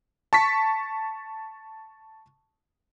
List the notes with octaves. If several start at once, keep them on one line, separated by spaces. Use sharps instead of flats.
A5 C#6 B6